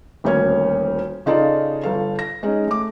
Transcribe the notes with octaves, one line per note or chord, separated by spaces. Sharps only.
D#1 D2 A#3 C#4 C#5 G#6
C#3 D#4 F4 A4 D5
G1 A4 F5
A#6
G#3 C#4 D#4
A3 D6